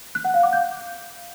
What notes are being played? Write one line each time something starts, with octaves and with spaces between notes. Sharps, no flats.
F#6
F#5
F5
D6
G6